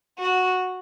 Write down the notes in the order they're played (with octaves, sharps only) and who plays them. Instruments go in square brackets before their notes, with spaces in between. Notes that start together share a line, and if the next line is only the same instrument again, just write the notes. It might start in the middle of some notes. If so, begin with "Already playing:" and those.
[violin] F#4